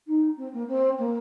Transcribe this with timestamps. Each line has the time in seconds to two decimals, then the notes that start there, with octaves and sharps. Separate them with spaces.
0.07 D#4
0.37 C4
0.53 A#3
0.68 C4
0.98 A#3